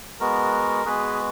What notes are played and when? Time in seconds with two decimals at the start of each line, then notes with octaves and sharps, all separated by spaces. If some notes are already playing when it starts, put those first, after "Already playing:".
0.20 G#3 B3 F#4 A#4
0.85 G#3 B3 F#4 G#4 B4